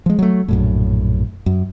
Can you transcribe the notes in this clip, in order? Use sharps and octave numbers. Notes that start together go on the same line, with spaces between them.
F3 G#3
F#3 A3
A#1 F#2 A2
F#2